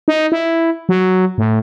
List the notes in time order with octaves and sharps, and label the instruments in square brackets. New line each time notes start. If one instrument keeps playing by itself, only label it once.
[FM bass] D#4
E4
F#3
A2